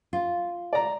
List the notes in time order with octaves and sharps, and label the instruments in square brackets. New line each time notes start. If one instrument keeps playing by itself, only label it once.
[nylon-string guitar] F4
[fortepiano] D5 A#5